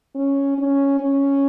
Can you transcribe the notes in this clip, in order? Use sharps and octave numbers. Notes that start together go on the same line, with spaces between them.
C#4
C#4
C#4